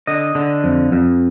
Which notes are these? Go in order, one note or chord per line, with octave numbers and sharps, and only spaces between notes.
D3 D#5
D3
F2
F2